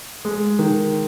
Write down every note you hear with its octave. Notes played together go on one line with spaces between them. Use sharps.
G#3
D#3